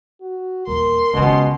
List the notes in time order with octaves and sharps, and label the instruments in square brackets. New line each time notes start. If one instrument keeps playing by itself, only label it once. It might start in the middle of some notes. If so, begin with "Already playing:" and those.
[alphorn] F#4
[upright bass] D#1 E2 [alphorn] A#4 [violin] C6
[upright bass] C#2 D#3 [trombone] B2 [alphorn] C#4